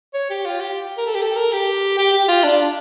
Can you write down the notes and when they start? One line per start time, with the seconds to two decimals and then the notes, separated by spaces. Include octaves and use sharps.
0.14 C#5
0.30 G4
0.45 F4
0.60 G4
0.98 A#4
1.07 A4
1.15 G4
1.22 A4
1.36 A#4
1.52 G4
1.98 G4
2.13 G4
2.28 F4
2.43 D4